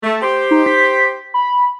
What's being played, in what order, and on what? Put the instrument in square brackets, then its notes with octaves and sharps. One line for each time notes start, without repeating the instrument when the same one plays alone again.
[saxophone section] A3
G4 C5
[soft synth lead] D#4
B6
B5